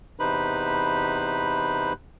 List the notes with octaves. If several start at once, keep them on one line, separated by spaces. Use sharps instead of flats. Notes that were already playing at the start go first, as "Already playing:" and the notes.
E2 C3 D#4 B4 C5 B5